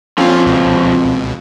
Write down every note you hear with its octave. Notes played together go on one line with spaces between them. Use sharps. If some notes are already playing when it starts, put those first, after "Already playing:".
F2 A#2 F3 C4 C#4 F4
C#2 B2